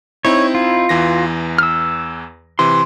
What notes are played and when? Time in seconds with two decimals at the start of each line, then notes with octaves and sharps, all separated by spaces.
0.25 C4 D#4 E4 C#5
0.55 F4
0.89 E2 E3 A#6
1.58 E6 F6
2.59 C3 E3 C6